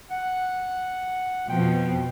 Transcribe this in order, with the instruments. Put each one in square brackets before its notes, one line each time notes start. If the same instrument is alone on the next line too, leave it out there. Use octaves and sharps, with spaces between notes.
[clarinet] F#5
[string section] F2 B2 F3 [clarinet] G5